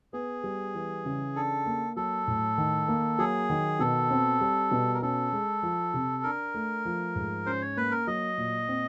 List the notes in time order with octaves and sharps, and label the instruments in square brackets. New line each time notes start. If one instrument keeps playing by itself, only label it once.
[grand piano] B3 [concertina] G#4
[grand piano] G3
E3
C#3
[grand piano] D4 [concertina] A4
[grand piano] A#3
[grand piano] F#3 [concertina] A4
[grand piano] A2
D#3
A#3
[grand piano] F#3 [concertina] G#4
[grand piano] D#3
[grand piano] B2 [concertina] A4
[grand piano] C4
G3
B2
[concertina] A#4
[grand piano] C#4 [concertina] A4
[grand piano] G#3
F3
C3
[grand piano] D4 [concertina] A#4
[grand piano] A3
F3
G#2
[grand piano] C#4 [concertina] C5
[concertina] C#5
[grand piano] A#3 [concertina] B4
[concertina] A#4
[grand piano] F#3 [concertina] D#5
[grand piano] A#2
C4